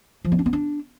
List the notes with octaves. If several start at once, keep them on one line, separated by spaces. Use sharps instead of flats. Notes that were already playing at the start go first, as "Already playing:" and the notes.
F3
B3
D4
B3
D4